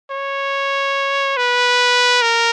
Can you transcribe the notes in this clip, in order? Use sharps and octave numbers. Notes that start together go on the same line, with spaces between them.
C#5
B4
A#4